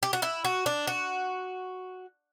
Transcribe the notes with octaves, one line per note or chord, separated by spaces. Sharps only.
G4
F#4
E4
F#4
D4
F#4